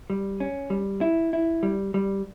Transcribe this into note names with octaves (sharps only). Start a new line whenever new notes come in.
G3
C#4
G3
E4
E4
G3
G3